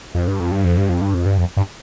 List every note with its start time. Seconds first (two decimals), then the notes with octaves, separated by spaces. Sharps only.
0.15 F2
0.28 G2
0.40 F2
0.52 G2
0.64 F2
0.77 G2
0.89 F2
1.01 G2
1.14 F2
1.26 G2
1.38 F2
1.57 G2